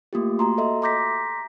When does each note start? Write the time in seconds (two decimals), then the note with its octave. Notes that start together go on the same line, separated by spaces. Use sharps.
0.13 A3 A#3 F4 G4
0.39 F#4 A#5 C6
0.58 A4 D#5 E5 C6
0.82 A#5 C6 D6 G6 A#6 B6